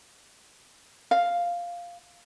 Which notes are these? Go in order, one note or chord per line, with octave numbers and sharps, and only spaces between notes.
F5